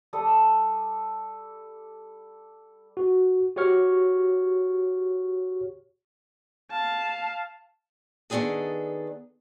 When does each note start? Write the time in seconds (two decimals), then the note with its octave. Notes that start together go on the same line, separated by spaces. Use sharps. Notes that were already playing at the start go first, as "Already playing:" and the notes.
0.13 G3 A4 D#6
2.97 F#4
3.56 F#4 G4 C#5 C#6 F6
6.72 F5 A5
8.30 D#3 B3 C4 D4 G#4 A4